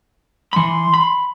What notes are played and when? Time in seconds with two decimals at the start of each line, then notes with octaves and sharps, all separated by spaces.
0.53 E3 B5 C6
0.94 B5